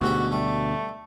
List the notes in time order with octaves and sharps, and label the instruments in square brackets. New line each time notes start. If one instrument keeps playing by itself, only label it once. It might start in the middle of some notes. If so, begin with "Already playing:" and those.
[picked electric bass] D2 B2 [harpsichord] G#2 A3 G4 [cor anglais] F#4
[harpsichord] G3 [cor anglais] A3